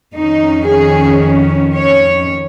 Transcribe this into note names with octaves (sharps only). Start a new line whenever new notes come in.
F2 D#3 C#4 D#4
G#4
C#5